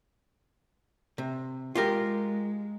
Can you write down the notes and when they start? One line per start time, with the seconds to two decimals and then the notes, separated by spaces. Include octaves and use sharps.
1.18 C3
1.75 G#3 F4 G4 A#4